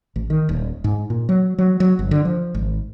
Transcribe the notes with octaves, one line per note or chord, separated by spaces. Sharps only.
A1
D#3
D#1
G#2
A#2
F#3
F#3
F#3
G1
D3
F3
G#1